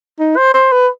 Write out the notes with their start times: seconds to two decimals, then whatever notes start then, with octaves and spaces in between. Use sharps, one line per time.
0.19 D#4
0.37 C5
0.54 C5
0.72 B4